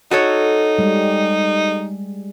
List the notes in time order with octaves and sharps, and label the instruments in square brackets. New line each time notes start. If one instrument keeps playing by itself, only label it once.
[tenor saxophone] D#4 [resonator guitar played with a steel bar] F#4 A4 C#5
[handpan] G3 G#3